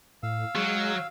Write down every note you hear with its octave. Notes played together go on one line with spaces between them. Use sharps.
A2 F5 E6
F#3 G#3